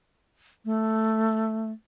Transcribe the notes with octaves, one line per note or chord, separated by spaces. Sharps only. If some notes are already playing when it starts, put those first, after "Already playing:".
A3